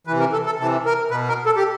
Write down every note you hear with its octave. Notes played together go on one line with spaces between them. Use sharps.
C3 E3 B4
A#4
A4
A4
C3 E3 A4
A#4
B2 B4
A#4
A4
G4